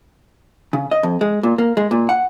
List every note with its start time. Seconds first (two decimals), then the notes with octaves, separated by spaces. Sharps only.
0.73 C#3
0.91 D#5
1.03 F2
1.21 G#3
1.43 A#2
1.58 A#3
1.77 G#3
1.91 A#2
2.09 F#5